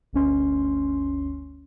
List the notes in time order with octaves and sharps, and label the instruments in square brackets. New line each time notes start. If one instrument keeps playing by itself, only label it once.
[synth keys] G1 D2 C#4 C6